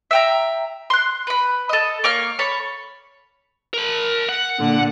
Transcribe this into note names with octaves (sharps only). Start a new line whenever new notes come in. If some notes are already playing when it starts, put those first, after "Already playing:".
E5 G5 A#5
C6 F#6
B4 B5
A4 D#5
A#3 C#5 C#6 F6
A4 C#5 B5
A#4 B5
F#5
A#2 D3